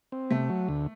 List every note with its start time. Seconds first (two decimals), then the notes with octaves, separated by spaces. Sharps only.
0.12 C4
0.31 C3 A3
0.50 F#3
0.69 D2